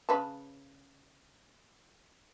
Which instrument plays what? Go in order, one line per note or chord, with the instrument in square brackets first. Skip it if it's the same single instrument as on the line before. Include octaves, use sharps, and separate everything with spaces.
[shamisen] C#3 B4 A5